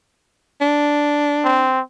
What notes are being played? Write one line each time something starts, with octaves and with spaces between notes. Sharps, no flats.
D4
C4